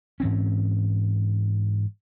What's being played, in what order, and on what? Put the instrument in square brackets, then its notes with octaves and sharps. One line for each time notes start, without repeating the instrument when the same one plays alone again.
[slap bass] G#2 E3 C4 C#4